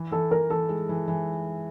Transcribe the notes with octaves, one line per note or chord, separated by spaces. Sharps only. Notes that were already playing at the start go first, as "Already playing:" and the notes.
Already playing: E3
E3 A4
E3 A#4
E3 A4
G#3
E3
E3